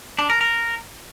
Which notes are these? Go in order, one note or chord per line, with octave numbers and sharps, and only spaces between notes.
D4
A#4
A#4